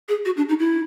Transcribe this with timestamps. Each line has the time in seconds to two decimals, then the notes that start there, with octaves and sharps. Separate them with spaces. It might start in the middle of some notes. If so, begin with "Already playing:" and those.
0.08 G#4
0.25 F#4
0.37 D4
0.49 D#4
0.59 E4